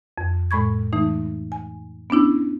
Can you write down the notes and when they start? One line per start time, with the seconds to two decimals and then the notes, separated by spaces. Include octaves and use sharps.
0.18 F2
0.51 A2 G#3 B5 C#6 G#6
0.93 E3 A3 D#4
1.52 G#5
2.10 B3 C#4 D4 E4